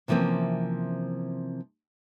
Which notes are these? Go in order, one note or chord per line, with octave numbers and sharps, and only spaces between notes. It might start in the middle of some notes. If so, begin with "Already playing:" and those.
C3 E3 F3 A#3 C4 C#4